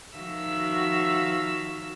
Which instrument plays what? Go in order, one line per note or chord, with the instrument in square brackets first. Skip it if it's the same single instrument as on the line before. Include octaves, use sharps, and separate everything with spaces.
[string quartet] D#3 F3 F#4 E5 F5 E6